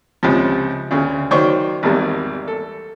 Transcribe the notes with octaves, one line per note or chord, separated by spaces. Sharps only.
C#2 C3 F3
D2 C#3
D#3 F#3 C5 D5 C#6
G#1 E2 G3
A4